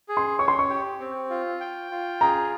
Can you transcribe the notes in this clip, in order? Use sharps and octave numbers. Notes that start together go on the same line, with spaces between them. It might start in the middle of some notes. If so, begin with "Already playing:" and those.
G#4
C6
C#5 C#6
C6
C#6
G4
C4
F4
G5
F4
G#4 A#5